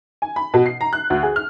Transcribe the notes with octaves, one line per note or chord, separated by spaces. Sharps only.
G#5
B5
B2
C7
A#5
F#6
D2
G#4
F6